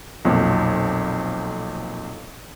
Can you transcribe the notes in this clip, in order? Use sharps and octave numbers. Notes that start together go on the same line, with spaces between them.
B1 F2 A#2